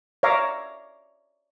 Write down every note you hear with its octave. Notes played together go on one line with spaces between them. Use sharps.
C#5 D5 E5 F5 A#5 D6